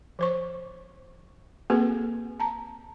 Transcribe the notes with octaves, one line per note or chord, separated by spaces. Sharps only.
F3 C5 C#6
A#3 C4 F#4 G#4 A4 B4
A5 A#5